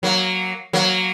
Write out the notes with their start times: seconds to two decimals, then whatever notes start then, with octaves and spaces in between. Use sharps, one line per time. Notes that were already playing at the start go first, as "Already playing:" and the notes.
0.03 F#3 A#3
0.73 F#3 A#3